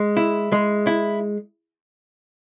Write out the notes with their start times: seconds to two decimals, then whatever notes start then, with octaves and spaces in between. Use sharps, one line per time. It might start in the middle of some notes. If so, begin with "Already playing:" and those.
Already playing: G#3
0.17 E4
0.52 G#3
0.87 E4